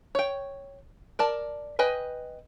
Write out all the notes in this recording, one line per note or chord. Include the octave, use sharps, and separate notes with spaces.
C#5 G5
A#4 D5 A5
B4 D#5 G5 G#5